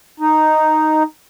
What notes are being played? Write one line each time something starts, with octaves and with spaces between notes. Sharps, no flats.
D#4